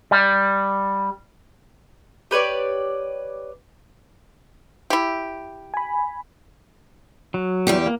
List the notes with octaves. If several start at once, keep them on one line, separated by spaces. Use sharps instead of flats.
G3
G4 B4 C#5 D5
E4 G4
G#5 B5
F#3
E2 G3 G4
A#3